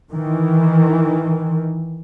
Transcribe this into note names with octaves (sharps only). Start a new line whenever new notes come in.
D#3 E3